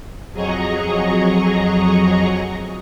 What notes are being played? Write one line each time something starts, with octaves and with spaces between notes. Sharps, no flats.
F2 F#3 G#4 D#5 A#5 C#6